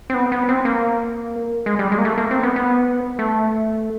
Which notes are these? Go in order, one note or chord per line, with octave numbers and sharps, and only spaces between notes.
C4
B3
B3
C4
A#3
G#3
G3
G#3
A#3
A3
A#3
C4
B3
B3
A3